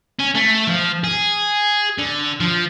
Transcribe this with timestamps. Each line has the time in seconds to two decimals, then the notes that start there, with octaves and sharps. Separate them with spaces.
0.20 C#4
0.35 A3
0.68 F3
1.04 G#4
1.98 D3
2.40 F3